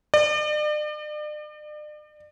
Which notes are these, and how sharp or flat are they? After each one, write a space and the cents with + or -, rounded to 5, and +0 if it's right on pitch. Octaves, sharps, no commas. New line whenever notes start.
D5 +40